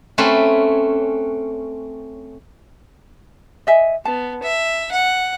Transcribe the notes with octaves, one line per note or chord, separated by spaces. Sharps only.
A3 C4 C#4 B4
D#5 E5 G#5
B3 A5
E5
F#5